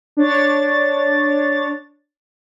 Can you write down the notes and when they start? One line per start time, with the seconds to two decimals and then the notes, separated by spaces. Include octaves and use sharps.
0.17 D4 C#5 A6